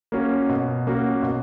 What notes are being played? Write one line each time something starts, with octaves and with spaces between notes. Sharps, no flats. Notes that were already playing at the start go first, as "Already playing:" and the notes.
A#3 C#4 F#4
B2
A#3 C#4 F#4
B2